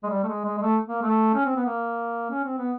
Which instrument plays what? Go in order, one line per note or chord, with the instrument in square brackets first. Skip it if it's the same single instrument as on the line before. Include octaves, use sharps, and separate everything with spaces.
[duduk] G#3
G3
A3
G#3
G#3
G#3
A3
A#3
A3
C#4
C4
B3
A#3
C#4
C4
B3